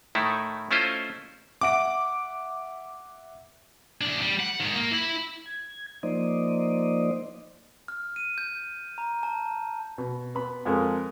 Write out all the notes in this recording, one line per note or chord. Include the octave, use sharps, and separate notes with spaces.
A2 D#3 A3 D#4 E4
A3 C#4 E4 F4 C5 D#5
E5 F#5 D6 D7
E2 D4
G3
F#5
G#2 D#3
A#3
E4 B5
G#6
F3 A#3 D#4 C5 D5 D#5
F6
D#7
G6
A#5
A5
B2
B3 B5
F2 G#3 A4 A#4